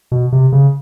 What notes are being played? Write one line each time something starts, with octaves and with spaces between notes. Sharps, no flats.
B2
C3
C#3